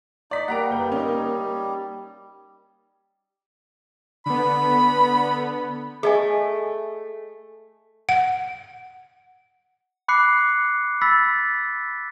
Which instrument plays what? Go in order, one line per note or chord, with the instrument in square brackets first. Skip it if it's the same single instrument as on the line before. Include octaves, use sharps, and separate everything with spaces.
[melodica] D#4 [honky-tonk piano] D5 B6
[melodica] G3 [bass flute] A#3 [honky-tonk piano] F#5 A#5 D7
[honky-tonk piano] F#1 B4 G6
C#4 D#4
[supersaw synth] D3 B3 [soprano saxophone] B5
[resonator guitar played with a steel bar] A3 [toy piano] G#4 D#5 G#5
[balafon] F#5
[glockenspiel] B5 D6 F#6 C7 C#7
B5 E6 A6 B6